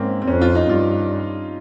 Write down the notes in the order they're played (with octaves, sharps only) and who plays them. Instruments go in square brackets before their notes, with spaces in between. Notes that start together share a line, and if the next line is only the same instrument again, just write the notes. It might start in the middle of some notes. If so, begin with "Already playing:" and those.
Already playing: [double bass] G#2 [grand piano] A#3 C4 C#4
[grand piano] C4
[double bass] F2 [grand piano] C#4
[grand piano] F4
D#4
[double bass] G2 [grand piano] F4